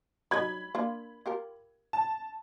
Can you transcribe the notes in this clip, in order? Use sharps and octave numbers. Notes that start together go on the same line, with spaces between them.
F#3 G3 D#4 B5 G#6
A#3 D4 F4
F4 G4 A#4
A5